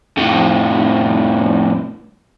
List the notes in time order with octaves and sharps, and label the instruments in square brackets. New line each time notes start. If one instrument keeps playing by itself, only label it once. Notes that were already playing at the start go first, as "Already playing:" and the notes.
[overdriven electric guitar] F2 A2